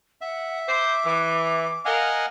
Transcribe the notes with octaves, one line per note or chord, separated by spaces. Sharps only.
E5 F#5
C5 D6
E3
A#4 D#5 F5 F#5 G#5